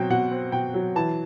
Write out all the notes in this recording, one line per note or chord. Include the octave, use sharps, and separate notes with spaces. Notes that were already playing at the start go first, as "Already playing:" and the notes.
Already playing: B2 F#3 C4 G5
B2 F#5
C4
B2 G5
F#3
E3 A5